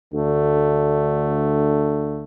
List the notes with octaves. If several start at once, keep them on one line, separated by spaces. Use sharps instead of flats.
D2 D3 A3